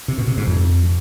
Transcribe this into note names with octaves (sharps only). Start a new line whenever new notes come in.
C3
B2
C3
G#2
F2